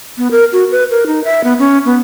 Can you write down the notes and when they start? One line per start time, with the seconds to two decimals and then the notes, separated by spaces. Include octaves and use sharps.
0.18 B3
0.31 A#4
0.53 F#4
0.71 B4
0.91 A#4
1.07 D#4
1.24 E5
1.44 B3
1.59 C#4
1.85 B3